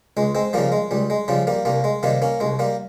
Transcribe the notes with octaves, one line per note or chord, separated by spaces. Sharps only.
C#2 G#3
G#3 C4
C#3 F3 G3 A#3
G#3
C#2 G3
G#3
C#3 F3 G3
G3 A#3
C2 G3 A#3
G#3
C3 D#3 G3 A#3
A#3 C#4
C2 G#3
G3 A#3